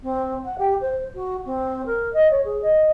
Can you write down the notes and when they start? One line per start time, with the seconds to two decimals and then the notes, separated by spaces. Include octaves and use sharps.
0.02 C4
0.44 F#5
0.58 G4
0.81 C5
1.14 F#4
1.45 C4
1.86 A#4
2.13 D#5
2.30 C#5
2.44 G#4
2.62 D#5